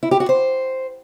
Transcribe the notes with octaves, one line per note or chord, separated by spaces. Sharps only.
E4
G4
F#4
C5